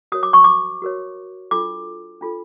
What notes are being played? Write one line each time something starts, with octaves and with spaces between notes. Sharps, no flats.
F#4 A#4 C#5 D#6
D6
C#6
D6
F#4 A#4 C#5
D4 F4 A4 D6
D4 F4 A4